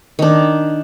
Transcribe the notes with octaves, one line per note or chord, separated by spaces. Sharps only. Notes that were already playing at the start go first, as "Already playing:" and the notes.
D#3 D4